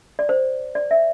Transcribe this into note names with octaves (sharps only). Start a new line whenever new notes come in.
D5
C5
D5
E5